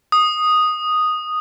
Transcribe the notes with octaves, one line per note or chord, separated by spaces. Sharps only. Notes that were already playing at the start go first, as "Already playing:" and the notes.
D#6